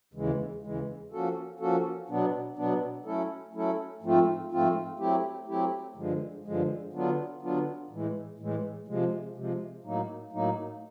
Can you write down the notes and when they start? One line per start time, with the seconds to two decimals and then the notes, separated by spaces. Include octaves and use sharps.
0.14 D#2 C#3 E3 G#3
0.63 D#2 C#3 E3 G#3
1.12 F3 A#3 C#4 F#4 A4
1.60 F3 A#3 C#4 F#4 A4
2.09 B2 F#3 B3 D4
2.56 B2 F#3 B3 D4
3.05 F#3 A3 C#4 E4 A4
3.54 F#3 A3 C#4 E4 A4
4.02 G#2 F3 A3 C4 F4
4.51 G#2 F3 A3 C4 F4
4.99 F#3 A3 C4 E4 G4
5.47 F#3 A3 C4 E4 G4
5.96 G2 D3 F3 G#3
6.44 G2 D3 F3 G#3
6.93 D3 F#3 B3 D4 F4
7.42 D3 F#3 B3 D4 F4
7.90 A2 E3 G#3
8.39 A2 E3 G#3
8.88 C3 F3 G#3
9.35 C3 F3 G#3
9.84 A2 F#3 A#3 D#4
10.33 A2 F#3 A#3 D#4